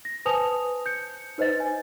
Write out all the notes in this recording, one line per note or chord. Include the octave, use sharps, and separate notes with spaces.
A#6
B4 C5 G#5 A5 D#6 F7
G6 C#7
D#4 B4 C5 D#5 A6
G#5